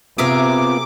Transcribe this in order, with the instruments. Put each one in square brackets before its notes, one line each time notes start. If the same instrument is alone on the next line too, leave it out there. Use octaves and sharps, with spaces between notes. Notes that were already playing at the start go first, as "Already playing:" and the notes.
[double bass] C3 [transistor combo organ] B3 C4 F4 [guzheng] G#4 A#4 E5 [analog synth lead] D6